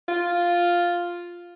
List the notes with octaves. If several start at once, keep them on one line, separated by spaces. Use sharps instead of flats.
F4